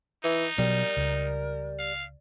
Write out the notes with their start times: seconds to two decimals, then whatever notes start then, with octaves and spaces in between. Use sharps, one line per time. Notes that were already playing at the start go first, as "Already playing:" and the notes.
0.24 E3 D#4
0.58 B2 F#3 G3 A#4
0.97 C#2
1.79 F5